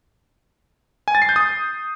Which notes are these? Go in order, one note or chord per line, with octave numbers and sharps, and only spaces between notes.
G#5
A6
C7
G6
D#6